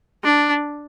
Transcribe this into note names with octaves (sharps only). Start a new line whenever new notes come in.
D4